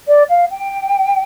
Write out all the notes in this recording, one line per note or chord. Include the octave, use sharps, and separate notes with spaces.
D5
F5
G5